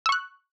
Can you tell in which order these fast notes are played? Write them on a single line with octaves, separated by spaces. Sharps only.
E6 C#6 F#6